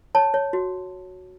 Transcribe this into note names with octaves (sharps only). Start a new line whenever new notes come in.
C#5 A5
C#5
F#4